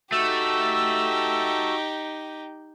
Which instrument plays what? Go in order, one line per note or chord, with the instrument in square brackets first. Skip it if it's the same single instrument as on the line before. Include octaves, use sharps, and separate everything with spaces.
[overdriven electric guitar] A3 [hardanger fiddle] D#4 G4 [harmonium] F#4 [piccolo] E6